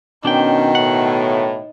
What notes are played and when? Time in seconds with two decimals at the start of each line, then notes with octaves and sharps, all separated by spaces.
0.25 B2 D#3 C#4 D4 G5
0.75 A2 F#5